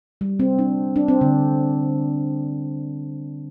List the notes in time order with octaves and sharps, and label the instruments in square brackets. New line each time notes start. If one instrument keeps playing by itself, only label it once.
[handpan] G3
C4
D4
D4
C4
D3